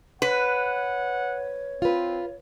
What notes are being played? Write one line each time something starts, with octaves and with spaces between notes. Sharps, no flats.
B4 C#5 F#5
C4 F4 B4